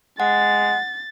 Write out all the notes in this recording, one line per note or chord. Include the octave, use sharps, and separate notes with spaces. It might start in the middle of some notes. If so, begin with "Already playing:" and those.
G#3 F#5 A6